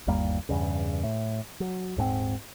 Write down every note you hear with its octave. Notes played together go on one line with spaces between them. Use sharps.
G1 D#2 G3 A#3
E2 G2 C#3
A2
F#3
D#1 G#2 A3 C4